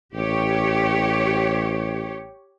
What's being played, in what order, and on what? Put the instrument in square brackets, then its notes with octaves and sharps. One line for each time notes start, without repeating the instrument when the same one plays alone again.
[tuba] A1 [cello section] G4 C#5